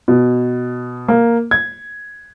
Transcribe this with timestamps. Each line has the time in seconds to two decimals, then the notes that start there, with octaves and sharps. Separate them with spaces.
0.08 B2
1.08 A#3
1.51 G#6